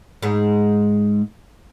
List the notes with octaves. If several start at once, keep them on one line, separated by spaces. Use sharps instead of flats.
G#2 G#3